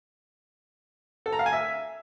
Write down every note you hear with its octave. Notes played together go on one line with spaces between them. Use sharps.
A4
A#5
F5
G#5
E5